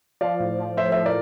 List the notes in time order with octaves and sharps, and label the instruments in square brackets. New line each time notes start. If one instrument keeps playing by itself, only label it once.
[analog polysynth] F3 [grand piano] D5 F5
[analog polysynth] A2
F3
[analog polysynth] A2 [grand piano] C5 E5
[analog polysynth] F3 [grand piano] C5 E5
[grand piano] A#4 D5